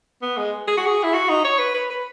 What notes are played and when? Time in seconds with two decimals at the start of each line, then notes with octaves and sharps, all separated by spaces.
0.22 B3
0.37 G#3
0.67 G#4
0.77 F#4
0.86 G#4
1.03 E4
1.14 F#4
1.29 D#4
1.45 C#5
1.59 B4
1.75 B4
1.90 B4